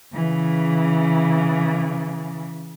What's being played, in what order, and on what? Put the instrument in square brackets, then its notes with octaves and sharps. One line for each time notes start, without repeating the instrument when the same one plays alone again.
[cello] C#3 E3